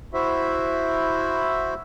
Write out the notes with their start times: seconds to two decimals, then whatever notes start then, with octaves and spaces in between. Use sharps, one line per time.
0.14 E4 F#4 C5 E5